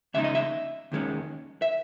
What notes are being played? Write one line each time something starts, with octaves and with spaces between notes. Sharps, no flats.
D#2 C#3 G#3 D#4 E5
D#5
E5
D#2 D#3 G#3 C#4
E5